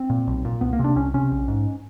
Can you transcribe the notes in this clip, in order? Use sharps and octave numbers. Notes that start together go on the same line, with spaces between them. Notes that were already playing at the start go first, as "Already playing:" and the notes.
Already playing: C4
A#2
B1
A#2
C2 B3
A#3
C3
D4
C2 C#4
C3 C#4
A#1
G#2